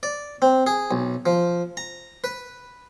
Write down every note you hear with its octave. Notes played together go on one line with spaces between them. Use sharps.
D5
C4
G#4
B1
F3
A#5
B4